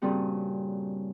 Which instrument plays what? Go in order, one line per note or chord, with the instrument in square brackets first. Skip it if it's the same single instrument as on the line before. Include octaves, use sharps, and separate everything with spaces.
[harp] G2 A#2 C#3 G3 C4 F#4